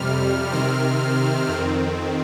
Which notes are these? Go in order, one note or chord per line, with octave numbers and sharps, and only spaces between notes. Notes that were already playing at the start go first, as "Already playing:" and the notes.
Already playing: F2 C3 G3 F6
C3 D#3 C4 F6
F2 D#3 C4